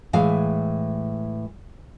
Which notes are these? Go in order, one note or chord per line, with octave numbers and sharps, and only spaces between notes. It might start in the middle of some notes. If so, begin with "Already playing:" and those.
A2 E3 G#3 E5 F5